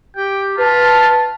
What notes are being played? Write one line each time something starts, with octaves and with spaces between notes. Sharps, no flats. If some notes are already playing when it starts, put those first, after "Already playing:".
G4 G5
F4 B4 A5